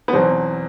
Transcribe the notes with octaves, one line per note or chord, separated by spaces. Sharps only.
B3
E2 B2 F#3 C4